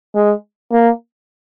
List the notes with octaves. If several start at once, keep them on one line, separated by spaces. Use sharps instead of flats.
G#3
A#3